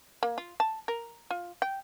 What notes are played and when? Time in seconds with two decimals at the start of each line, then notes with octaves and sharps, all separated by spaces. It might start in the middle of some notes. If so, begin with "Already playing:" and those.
0.23 A#3
0.38 F4
0.60 A5
0.88 A#4
1.31 F4
1.62 G5